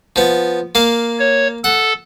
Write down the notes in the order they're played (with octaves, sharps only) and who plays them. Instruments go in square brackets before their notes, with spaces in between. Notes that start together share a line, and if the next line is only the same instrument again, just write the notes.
[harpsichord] F3 B3
A#3 F5
[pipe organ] C#5
[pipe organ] A4 [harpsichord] F#5